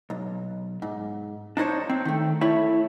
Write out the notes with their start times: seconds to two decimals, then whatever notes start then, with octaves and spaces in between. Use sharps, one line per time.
0.10 B1
0.82 G#2
1.57 D4 D#4 C5 C#5
1.89 C4
2.05 D#3 A3
2.41 A3 E4 C#5